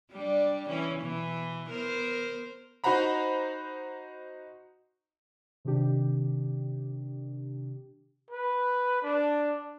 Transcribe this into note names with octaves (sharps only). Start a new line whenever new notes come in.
G3 D4
E3 C#4
B2 E3
B3 A#4 C5
D#4 F#4 C5 F#5 A#5 B5
C3 D#3 D4 G4
B4
D4